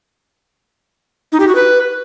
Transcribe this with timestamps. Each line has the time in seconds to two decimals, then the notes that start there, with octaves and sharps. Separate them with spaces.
1.32 D#4
1.40 G4
1.48 F#4
1.55 B4